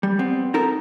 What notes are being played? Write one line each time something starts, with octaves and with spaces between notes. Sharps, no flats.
G3
B3 C4
D#4 A4 A#4